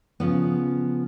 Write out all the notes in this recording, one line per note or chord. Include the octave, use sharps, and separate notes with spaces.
C#3 F3 B3